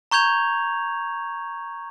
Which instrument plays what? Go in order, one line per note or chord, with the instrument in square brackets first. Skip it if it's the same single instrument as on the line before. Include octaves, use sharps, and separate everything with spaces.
[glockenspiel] A#5 C#6 G6 G#6 F7